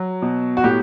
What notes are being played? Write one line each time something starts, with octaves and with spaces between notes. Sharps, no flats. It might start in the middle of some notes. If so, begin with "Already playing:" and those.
Already playing: F#3
B2
F#4
A2 G4